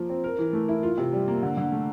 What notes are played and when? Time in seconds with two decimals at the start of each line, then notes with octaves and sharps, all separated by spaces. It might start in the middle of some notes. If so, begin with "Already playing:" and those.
Already playing: F3 A#3
0.09 C4
0.24 A#4
0.38 E3
0.53 A3
0.69 E4
0.83 F4
0.98 C3
1.13 G3
1.28 A#3
1.43 D3
1.57 D3
1.72 A3